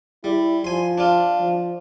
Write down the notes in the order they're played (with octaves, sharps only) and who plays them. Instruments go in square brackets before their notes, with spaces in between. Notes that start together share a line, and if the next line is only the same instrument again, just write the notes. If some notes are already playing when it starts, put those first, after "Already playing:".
[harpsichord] G3 [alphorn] E4
[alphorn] F3 [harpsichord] G#5 C6
[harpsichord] D4 F4
[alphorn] F3